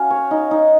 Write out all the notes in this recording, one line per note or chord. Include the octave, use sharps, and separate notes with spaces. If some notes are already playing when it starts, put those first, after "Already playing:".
Already playing: C#4 F#4 F5
C#5
D#4
D#4